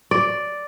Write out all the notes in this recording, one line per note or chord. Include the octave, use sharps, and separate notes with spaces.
D5